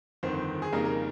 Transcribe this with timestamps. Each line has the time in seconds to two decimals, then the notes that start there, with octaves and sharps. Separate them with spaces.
0.23 G1 F2 D#3 C5
0.62 G#4
0.73 F2 C#3 G3 A#3 D#4 A#4
0.85 A#4